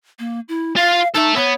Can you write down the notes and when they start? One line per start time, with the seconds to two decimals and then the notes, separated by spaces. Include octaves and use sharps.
0.19 A#3
0.49 E4
0.76 F4 F5
1.14 D#4 A4 E5
1.36 B3 C#5